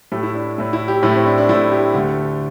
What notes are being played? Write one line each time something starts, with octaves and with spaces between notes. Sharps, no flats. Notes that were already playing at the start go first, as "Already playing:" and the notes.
A2 A3 G4
E4
D4
D4
A2 A3
E4
G4
A2 A3 E4
C4
D4
D4
A2 A3 E4
G4
D2 D3 A3